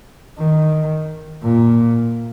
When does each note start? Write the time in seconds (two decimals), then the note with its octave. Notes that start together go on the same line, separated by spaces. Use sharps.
0.38 D#3
1.44 A#2